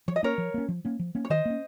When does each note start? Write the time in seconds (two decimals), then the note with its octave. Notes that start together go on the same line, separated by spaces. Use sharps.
0.08 F3 C#5
0.16 D#5
0.23 A#3 C#4 A#4 C#5
0.38 F3
0.54 A#3 C#4
0.69 F3
0.85 A#3 C#4
0.99 F3
1.15 A#3 C#4
1.25 C#5
1.30 D#3 C5 D#5
1.45 A#3 C#4